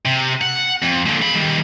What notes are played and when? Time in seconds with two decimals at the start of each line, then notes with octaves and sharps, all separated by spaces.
0.05 C3
0.41 F#5
0.83 F2
1.06 A#2 D3
1.22 F5 B5
1.35 D#3 G3